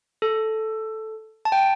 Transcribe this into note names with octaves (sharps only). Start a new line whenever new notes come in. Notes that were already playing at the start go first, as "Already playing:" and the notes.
A4
A5
G5